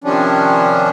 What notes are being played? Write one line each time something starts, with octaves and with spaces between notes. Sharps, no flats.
C3 D#3 F3 G3 C#4 D4